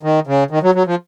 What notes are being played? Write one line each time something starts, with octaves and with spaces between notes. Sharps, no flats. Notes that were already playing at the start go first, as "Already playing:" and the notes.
D#3
C#3
D#3
F#3
F#3
F3